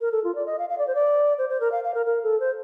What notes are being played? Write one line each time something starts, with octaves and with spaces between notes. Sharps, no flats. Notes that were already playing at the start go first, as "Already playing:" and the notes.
A#4
A4
F4
D5
D#5
F5
F5
D5
C5
D5
C5
C5
A#4
F5
F5
A#4
A#4
A4
C5